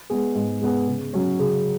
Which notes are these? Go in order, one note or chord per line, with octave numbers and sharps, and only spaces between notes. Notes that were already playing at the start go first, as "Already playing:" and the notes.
G#3 B3 G#4
G#2
G#3 B3 G#4
C#3
F#3 C#4
C#3